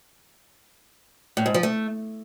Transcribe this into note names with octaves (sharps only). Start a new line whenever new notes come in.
A2
G#2
F3
A3